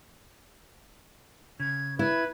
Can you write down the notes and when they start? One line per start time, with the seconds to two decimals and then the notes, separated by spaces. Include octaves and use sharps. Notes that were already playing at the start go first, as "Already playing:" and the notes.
1.60 C#3 G#6
1.99 E4 B4 G#6